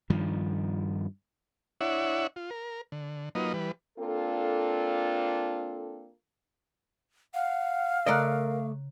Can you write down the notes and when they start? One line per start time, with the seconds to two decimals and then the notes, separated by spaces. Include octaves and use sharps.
0.10 G2 D#3 F3
1.81 D4 E4 C#5 E5 F#5
2.36 F4
2.50 A#4
2.92 D3
3.35 F#3 A#3 D#4 F4 B4 D#5
3.54 E3 G3 B4
3.98 A#3 C4 D4 F4 A4
7.34 F5 F#5
8.06 C#3 A3 A#4 D5 D#5 A#5 F#6